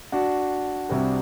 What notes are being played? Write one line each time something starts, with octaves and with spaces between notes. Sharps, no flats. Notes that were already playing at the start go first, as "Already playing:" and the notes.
D4 F#4
C2 C3 G3